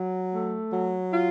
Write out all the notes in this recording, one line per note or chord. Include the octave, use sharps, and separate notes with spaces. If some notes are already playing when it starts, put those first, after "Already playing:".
Already playing: F#3
A3
F#3
F4